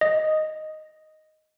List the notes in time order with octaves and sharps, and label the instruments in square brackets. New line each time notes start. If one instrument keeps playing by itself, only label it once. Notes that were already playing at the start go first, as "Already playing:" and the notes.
[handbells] D#5